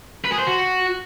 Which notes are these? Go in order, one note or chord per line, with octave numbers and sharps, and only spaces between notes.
B4
G#4
C5
F#4